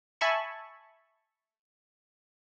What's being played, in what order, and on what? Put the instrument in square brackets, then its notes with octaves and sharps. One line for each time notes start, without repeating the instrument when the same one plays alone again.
[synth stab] E5 G#5 A5 B5 C#6